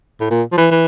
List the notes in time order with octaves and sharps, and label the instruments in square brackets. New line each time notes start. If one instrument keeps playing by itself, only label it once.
[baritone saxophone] A2
A#2
F3
E3
E3